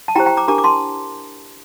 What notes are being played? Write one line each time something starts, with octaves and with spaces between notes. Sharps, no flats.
A5
E4 G4 C5 G5 A#5
G5 A#5
A#5 D6
D4 G4 A#4 A#5 D6
D6
A5 C6